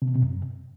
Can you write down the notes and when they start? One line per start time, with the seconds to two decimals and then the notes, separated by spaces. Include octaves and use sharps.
0.02 C3
0.09 B2
0.16 C3
0.22 F#2